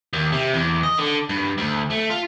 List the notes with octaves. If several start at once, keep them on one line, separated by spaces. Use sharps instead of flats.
D#2
C3
E2
D#5
D3
G2
D2
A3
F4